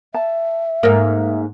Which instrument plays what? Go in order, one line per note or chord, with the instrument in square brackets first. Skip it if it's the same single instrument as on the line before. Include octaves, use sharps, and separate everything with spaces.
[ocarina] E5 [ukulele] A5
[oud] G#2 A#3 [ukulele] A#4